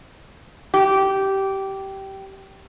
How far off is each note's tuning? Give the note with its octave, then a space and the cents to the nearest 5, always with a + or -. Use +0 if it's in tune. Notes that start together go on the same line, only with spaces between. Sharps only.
G4 -15